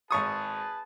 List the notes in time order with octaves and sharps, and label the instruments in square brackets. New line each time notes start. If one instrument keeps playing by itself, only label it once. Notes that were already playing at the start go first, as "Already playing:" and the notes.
[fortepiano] G#1 C#6 D#6 [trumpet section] G#4 B4 A5